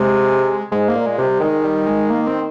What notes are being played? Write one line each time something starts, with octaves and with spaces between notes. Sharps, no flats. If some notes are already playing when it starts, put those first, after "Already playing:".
Already playing: C3 G#3
G#2 G#3
A#3
A#2
G#3
C3
G3
D#3 G#3
G3
G#3
A#3
C4